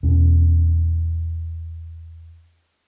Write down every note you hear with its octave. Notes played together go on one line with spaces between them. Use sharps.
E2 B2 C#4